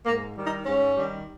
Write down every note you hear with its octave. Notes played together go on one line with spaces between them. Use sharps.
G#2 A#3
D#3 G3
D#4
G#2 C#4
D#3 G3